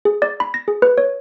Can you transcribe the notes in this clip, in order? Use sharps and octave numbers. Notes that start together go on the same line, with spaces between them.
G#4
D5
B5
A#6
G#4
B4
C#5